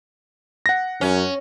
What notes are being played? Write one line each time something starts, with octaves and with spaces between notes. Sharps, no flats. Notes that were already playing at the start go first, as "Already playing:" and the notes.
F#5 A#6
F#2 C#4